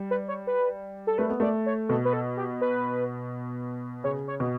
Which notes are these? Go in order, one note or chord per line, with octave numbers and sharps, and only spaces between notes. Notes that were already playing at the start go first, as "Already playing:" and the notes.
Already playing: G3
B4
C#5
B4
A4
A3 B4
B3
A3 D5
C#5
B2 A4
B4
A4
G4
B4
C#3 C#5
C#5
B2